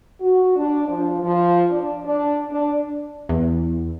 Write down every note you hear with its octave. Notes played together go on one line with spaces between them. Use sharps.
F#4
D4
F3
F3
D4
D4
D4
E2